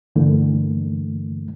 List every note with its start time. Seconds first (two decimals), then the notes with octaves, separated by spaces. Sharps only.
0.16 G2 D3 E3 A3 A#3